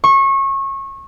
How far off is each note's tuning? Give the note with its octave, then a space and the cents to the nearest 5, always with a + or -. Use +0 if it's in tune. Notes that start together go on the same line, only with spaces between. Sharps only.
C#6 -25